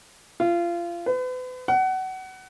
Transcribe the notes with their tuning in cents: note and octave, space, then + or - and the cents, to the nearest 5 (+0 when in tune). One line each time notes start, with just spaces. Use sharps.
F4 -25
B4 +40
F#5 +25